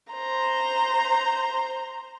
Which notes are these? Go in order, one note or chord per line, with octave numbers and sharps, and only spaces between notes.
C5 A#5